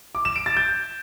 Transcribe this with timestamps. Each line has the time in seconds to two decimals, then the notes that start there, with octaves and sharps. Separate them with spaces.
0.15 D6
0.25 E7
0.36 D7
0.46 A6
0.57 G6